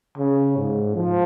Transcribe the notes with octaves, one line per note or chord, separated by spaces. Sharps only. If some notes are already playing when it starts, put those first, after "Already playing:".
C#3
G#2
F3